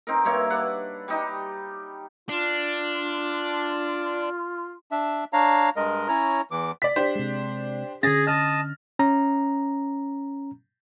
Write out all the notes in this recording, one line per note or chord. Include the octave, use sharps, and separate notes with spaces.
C4 D#4 A#4
G2 A#3 C#5 E5
D4 B4 F#5
G3 D#4 G4
D4 F4
D4 E5
D4 C#5 F5 A#5
G2 G#3 A#4 D#5
C#4 E4 C#5 A#5
E2 E3 D6
D5 B6
D4 G4 C5
C3 G#3
D3 C#4 G#4 A6 A#6
D#5 A5 F6
C#4 A#5